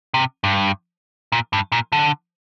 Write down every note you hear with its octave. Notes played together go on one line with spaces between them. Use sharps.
C3
G2
A#2
G2
A#2
D3